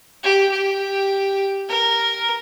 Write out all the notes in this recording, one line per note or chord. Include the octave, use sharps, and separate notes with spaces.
G4
G4
A#4